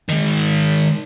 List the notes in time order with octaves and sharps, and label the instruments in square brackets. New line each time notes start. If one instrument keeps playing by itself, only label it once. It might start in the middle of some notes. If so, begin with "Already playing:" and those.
[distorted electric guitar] G#2 D#3